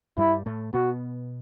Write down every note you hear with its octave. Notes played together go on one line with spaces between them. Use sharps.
G2 G3 E4
A2 A3
B2 B3 F#4